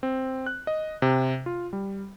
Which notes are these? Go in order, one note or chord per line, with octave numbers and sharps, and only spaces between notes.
C4
F#6
D#5
C3
F4
G3